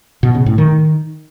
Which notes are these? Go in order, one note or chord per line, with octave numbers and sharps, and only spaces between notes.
B2
C#3
A2
D#3